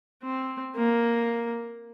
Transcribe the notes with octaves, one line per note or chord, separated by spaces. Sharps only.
C4
A#3